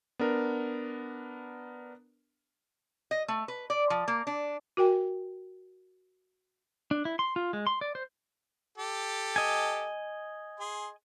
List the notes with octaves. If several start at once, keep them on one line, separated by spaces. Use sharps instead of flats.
B3 D4 A#4
D#5
A3
B4
D5
F3
A#3
D4
F#4 A#4 G5 G#5
D4
E4
C6
F4
G#3
C6
D5
C5
G4 A4
D#5 G#5
G#4 C6